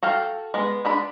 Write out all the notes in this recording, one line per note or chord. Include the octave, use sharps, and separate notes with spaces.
F#4 A4 F5 G5
G#3 B3
G#3 D4 B5